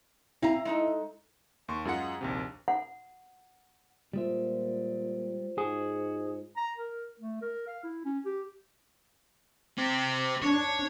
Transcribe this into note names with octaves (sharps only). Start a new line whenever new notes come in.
C4 E4 F5 A#5
G#3 D#4 A4
D#2 C6 C#6
F#2 G#3 F4 G#4 F#5 C#7
A#1 D#2 C3
F#5
A#2 G3 G#3 F4 C5 E5
G#2 F#4 G#4
A#5
A#4
A3
A#4
F5
E4
C#4
G4
C4 G4
D4 C#5